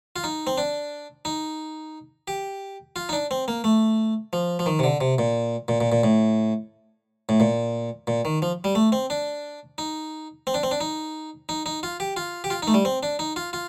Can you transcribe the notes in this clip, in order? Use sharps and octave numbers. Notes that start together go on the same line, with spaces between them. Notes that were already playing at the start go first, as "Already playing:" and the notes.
F4
D#4
C4
D4
D#4
G4
F4
D#4
D4
C4
A#3
A3
F3
F3
D#3
C3
D3
C3
A#2
A#2
A#2
A#2
A2
A2
A#2
A#2
D#3
F3
G3
A3
C4
D4
D#4
C4
D4
C4
D4
D#4
D#4
D#4
F4
G4
F4
G4
F4
D#4
A3
G3
C4
D4
D#4
F4
F4